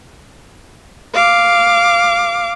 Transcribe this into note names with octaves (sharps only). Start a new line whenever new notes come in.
F5 D6